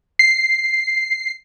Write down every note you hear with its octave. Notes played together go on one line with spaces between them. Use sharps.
C7